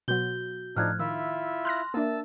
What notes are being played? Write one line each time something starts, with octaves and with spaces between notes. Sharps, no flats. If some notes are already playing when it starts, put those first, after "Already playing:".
B2 F#3 F#4 G6 G7
A2 F3 D4 D#4 F6 F#6 G#6
D#3 E4 F4 E5 E6
C6 F6 F#6 A#6
A#3 D4 A#4 E5 A5 E6